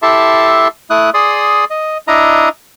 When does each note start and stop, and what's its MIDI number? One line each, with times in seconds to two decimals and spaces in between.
0.02 0.68 64
0.02 0.68 67
0.02 0.68 69
0.02 0.68 76
0.02 0.68 81
0.02 0.68 84
0.90 1.10 57
0.90 1.10 64
0.90 1.10 87
0.90 1.10 90
1.14 1.65 68
1.14 1.65 74
1.14 1.65 84
1.14 1.65 87
1.70 1.98 75
2.08 2.49 62
2.08 2.49 64
2.08 2.49 75
2.08 2.49 82